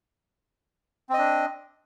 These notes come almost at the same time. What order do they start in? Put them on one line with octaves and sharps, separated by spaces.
C4 D#5 D4